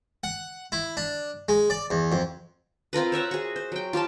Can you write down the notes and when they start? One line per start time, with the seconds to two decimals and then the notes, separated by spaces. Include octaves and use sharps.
0.24 F#5
0.72 E4
0.97 D4
1.49 G#3
1.70 D5
1.90 E2
2.12 F2
2.93 C4 F4 A#4 B4
3.12 C5 C#5 E5 F#5
3.31 F#4 G#4
3.56 C5
3.72 F#3 G5
3.93 F4 G4 F5 A5